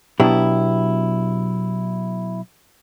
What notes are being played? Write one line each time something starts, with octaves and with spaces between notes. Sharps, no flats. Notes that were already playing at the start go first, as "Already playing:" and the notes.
B2 F#3 B3 D4 E4 G4